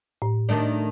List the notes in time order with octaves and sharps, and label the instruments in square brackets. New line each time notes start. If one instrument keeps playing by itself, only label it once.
[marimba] A2
[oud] D#3 A3 D4